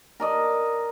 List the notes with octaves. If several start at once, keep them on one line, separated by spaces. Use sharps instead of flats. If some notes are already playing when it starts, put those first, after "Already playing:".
A#4 D5 D#5